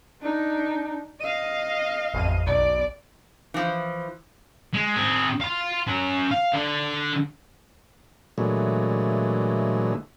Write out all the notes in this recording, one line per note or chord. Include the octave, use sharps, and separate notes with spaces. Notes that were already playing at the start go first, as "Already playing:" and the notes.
D4 D#4
D#5 F5 D#7
A1 F2 D#7
B1 B2 D5
E3 F3
G#3
C4 G#4
F5 C6
C#4 F#5
F5
D3
A#2 D3 E3 F#3 G#3 A3